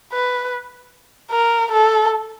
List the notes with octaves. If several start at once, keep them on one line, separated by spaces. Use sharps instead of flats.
B4
A#4
A4